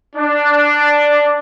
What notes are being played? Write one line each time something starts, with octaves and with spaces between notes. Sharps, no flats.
D4